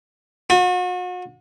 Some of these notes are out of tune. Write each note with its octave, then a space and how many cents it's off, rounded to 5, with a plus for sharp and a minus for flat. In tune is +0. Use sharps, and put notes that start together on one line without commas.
F#4 -40